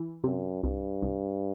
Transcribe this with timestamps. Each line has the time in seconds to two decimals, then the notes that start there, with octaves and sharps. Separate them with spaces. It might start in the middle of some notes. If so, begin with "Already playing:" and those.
Already playing: E3
0.24 F#2 C3
0.63 C2 G2
1.02 C2